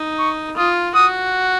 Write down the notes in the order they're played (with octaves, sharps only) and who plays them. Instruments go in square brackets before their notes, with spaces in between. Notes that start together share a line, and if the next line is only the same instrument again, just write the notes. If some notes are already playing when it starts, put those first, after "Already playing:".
Already playing: [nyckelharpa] D#4
[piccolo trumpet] C#6
[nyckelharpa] F4 [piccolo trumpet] D#6
[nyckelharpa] F#4 [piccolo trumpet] D#6